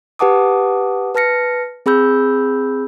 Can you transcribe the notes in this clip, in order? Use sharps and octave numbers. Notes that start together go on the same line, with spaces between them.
G4 B4 F#5 A5 D6 D#6
B4 A5 F6 A#6 C#7
C4 G#4 B5 E6 G6